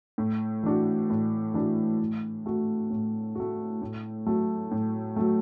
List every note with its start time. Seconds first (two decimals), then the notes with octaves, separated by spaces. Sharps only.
0.18 A2
0.63 E3 D4 F#4
1.10 A2
1.54 E3 D4 F#4
1.99 A2
2.46 A3 F#4
2.90 A2
3.35 A3 F#4
3.82 A2
4.26 F#3 A3
4.71 A2
5.16 F#3 A3